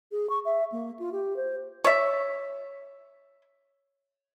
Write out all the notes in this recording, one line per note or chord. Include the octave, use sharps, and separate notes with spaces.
G#4
C#6
E5
A#3
F4
G4
C5
C#5 D5 E5